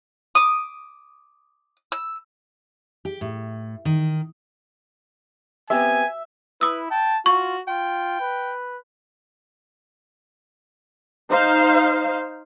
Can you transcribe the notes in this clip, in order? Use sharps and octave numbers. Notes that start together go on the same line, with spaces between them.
D6 D#6
E6
G4
A2
D#3
B3 C4 G4 E5 G#5
E4 B4 D#6 E6
G5 A5
F4 F#4 C#6
F4 G5
B4
D#4 C5 F5